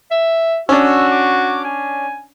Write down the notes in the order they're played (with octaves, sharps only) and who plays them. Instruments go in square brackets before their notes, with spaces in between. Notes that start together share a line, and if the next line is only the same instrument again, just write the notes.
[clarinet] E5
[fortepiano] C#4 D4 [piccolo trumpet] F#4 [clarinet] E6
[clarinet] D6
G#5